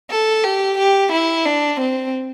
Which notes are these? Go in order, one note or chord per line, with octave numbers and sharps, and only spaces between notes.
A4
G4
G4
E4
D4
C4